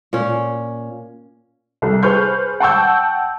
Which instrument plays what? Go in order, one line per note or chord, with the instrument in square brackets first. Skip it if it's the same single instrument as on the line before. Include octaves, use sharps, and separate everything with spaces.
[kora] A#2 C#4
[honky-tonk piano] C2 A4
G#4 B4 C5 C#6 F6 G6
F#5 G5 A5 C#6 E6 G6